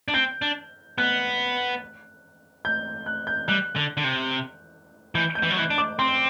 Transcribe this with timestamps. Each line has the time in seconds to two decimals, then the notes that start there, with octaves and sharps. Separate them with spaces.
0.08 D4
0.14 C4 G6
0.42 D4
0.98 B3 F#6
2.65 G6
3.06 F#6
3.27 G6
3.48 G3 F#6
3.76 D3
3.97 D3
4.04 C3
5.15 E3 G6
5.35 G6
5.43 E3
5.50 F#3
5.57 E3 F#6
5.70 D4
5.78 D6
5.99 C4 C6